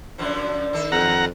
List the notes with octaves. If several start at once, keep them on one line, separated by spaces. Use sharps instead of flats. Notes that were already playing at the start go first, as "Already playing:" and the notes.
F#2 D3 F3
D#3 A4
F2 F#5 A#5